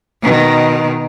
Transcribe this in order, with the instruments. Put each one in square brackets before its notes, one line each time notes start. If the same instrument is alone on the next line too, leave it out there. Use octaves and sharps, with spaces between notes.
[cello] B2 D#3